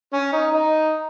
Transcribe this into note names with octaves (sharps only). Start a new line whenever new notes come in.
C#4
D#4
D#4